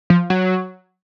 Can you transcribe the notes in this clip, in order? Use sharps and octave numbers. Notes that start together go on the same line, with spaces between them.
F3
F#3